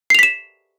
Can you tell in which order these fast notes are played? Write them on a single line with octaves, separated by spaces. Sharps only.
C7 F7 B6 E7